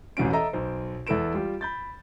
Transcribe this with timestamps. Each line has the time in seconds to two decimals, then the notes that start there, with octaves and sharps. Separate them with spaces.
0.17 A1 E2 B2 C#4 D7
0.33 A4 D#5 E5 A#5
0.53 B1 C5
1.07 E2 E4 A4 B4 D7 E7
1.34 G3 F4 G4
1.61 B5 G6 A6